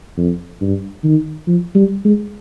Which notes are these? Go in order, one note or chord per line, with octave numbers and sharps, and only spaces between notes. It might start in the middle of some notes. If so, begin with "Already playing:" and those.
F2
G2
D#3
F3
G3
G#3